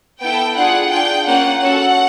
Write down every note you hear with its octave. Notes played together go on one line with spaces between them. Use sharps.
B3 E4 A4 G5
D4 F4 G#4 F#5
D4 F4 G#4 G5
A#3 C#4 F4 F#5
C#4 F#4 A4 F#5